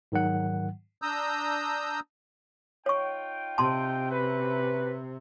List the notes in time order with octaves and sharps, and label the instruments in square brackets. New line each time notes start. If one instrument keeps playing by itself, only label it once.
[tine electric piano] G#2 D#3 F#3 F#5
[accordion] D4 A#5 D#6 E6 G6
[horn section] D#4 F4 G5 [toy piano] C#5 C#6
[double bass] C3 [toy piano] A5 C6
[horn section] C#4 F#4 B4